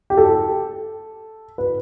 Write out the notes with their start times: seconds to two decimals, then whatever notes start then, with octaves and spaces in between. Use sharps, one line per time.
0.10 G4
0.17 A4
1.58 B4